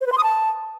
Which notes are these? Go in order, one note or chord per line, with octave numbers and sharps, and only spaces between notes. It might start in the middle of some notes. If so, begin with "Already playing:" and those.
C5
B4
C6
D#6
A5